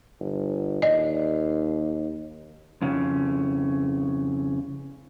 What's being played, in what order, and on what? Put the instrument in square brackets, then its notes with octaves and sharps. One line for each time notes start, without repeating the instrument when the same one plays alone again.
[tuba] G1
[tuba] D#2 [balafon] D5 D#5
[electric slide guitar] F2 C#3